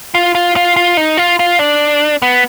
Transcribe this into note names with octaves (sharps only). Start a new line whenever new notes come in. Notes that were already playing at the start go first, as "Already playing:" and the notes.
F4
F4
F4
F4
D#4
F4
F4
D4
B3